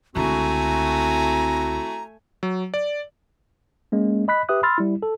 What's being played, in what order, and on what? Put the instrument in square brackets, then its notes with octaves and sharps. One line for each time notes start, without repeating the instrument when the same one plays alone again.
[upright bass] C#2 D3 [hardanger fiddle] A3 G#5 [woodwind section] C4 E4 F#4 [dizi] A#5
[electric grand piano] F#3
D5
[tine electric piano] G#3 A#3 C#4
D#5 B5 F#6 B6
G4 B4 E5 D#6 F#6
B5 C6 E6 F6 A6
G3 E4
A4